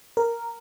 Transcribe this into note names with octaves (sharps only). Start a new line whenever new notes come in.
A#4